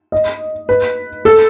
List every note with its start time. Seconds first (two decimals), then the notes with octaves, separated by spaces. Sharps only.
0.12 D#5
0.69 B4
1.25 A4